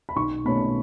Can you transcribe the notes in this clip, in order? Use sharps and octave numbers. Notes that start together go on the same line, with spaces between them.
B5
B1 C#6
B2 A3 C#4 B5